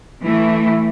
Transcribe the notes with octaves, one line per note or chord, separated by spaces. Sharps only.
E3 A3 E4